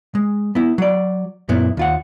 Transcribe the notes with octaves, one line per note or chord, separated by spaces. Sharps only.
G#3
B3 E4
F#3 D5
F#2 A#2 B3 E4
D#2 F4 F#5